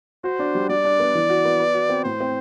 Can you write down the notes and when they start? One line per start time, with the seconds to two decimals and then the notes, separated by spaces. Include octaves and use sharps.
0.24 F#4 C5
0.39 D4
0.55 G3
0.69 G3 D5
0.85 D4
1.00 B3
1.15 E3
1.29 F#4
1.45 B3
1.59 B4
1.74 F#4
1.89 C4
2.04 A2 C5
2.20 C4